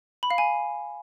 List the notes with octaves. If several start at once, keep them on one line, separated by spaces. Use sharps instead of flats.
B5
F5
G#5